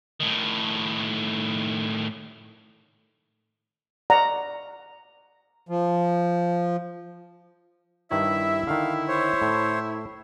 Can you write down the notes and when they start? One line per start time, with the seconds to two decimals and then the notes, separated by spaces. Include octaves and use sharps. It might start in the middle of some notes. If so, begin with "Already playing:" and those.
0.20 A2 D#3
4.10 D5 F#5 A#5
5.69 F3
8.11 G2 D#3 E4 C#5 E5
8.67 D3 D#3 F5
9.08 C5 C#5
9.42 A2